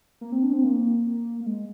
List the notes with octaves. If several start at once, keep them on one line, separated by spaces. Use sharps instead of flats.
A#3
C4
D4
C4
A#3
A#3
G#3